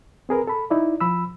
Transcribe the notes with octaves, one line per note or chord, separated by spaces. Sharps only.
C4 G#4 A#4 B4
A4 B5
D#4 E4 D5
F3 B5 E6